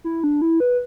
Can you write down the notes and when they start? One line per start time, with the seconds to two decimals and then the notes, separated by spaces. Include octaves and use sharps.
0.04 E4
0.24 D4
0.42 E4
0.60 B4